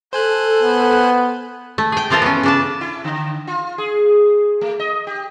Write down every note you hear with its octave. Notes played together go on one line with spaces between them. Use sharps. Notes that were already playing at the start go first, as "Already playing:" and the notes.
A4 C5 G#5 F#6
B3
A3
G#4 G5
E3 F3 F4 A4 A#4
B3 C#4
C#3 D4 A5
E4
D3
F4
G#4
A3
D#5
G4